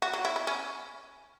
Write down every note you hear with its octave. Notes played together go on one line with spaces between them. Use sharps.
F#4
F#3
E4
E4
C#4